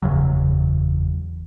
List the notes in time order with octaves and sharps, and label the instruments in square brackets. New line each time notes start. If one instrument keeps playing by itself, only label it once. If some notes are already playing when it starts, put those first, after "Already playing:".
[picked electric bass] F#1 E2 C#3 F#3